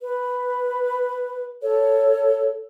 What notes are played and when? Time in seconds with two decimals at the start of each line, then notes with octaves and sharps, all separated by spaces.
0.01 B4
1.62 A4 C#5